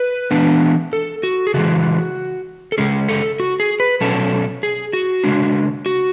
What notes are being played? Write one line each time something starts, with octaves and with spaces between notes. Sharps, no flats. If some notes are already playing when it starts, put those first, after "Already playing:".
Already playing: B4
E3 B3 D4
A4
F#4
G#4
C#3 E3 G#3 F#4
A4
C#3 G#3 C#4 G#4
A4
F#4
G#4
B4
B2 F#3 C#4 A4
G#4
F#4
C#3 G#3 D4
F#4